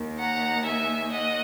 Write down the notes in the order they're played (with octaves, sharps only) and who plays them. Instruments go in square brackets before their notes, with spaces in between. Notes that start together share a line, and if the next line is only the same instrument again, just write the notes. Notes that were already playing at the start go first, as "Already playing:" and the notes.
Already playing: [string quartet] D#2 D#3
F#5 A#5
E5 G#5
D#5 F#5